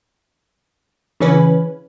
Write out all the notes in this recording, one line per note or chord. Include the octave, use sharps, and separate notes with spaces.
C#3 E3 C#4 B4